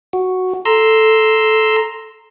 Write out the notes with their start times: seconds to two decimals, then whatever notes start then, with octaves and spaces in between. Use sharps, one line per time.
0.13 F#4
0.65 A4 A#5 C6 E6